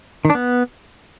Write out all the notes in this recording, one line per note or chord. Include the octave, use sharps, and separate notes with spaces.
D#3
D4
B3